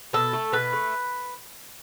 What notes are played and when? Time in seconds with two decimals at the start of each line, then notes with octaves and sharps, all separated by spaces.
0.13 B2 A4
0.33 A3
0.52 B2 B4
0.73 A3